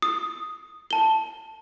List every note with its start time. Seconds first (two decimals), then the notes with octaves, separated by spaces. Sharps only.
0.02 D#6
0.91 A5 G7